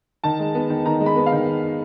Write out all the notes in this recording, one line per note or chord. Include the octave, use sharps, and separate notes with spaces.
D#3 A5
G#3
B3
D#3
D#3 A#5
G#3
B5
B3
F5
D#3